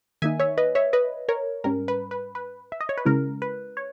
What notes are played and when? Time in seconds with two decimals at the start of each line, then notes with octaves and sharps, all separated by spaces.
0.22 D#3 A#3 D#4 E5 G#5
0.40 C#5 E5
0.58 B4 D#5
0.75 C#5 E5
0.93 B4 D#5
1.29 A#4 C#5
1.64 G#2 G3 C#4 A#4
1.88 B4
2.11 B4
2.35 B4
2.72 E5
2.81 D#5
2.89 C#5
2.98 B4
3.05 C#3 G#3 C#4 E4 A#4
3.42 B4
3.77 C#5